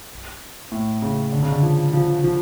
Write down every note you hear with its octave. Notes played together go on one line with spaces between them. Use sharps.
A2
C#3
D3
C#3
D3
F3
F3
F3